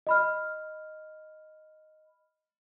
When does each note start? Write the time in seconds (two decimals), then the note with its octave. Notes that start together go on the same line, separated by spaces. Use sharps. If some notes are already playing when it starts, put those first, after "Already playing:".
0.07 D#5 B5 F6